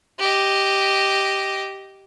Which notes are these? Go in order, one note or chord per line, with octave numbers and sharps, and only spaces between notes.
G4 D#5